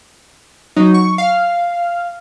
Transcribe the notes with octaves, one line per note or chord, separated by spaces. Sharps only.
F#3 D#4
C#6
F5